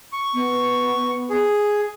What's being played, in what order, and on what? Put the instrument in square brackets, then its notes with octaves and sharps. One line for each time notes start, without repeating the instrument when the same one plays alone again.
[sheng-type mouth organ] C#6
[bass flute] B3
[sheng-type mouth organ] G#4